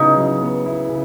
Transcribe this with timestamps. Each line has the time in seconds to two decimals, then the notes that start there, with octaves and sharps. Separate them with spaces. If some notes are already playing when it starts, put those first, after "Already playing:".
Already playing: C#3 F#3 B3 D#4 E4
0.17 F#3
0.42 B3
0.66 E4
0.89 C#3